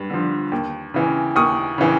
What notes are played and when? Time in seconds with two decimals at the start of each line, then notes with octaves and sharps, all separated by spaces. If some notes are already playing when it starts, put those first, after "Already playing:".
Already playing: G2
0.10 D3 F3
0.52 D#2
0.94 C#3 E3
1.35 D#2 C#6 D#6
1.78 C#3 E3